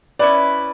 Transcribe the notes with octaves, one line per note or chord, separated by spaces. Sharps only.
C#4 E4 B4 D5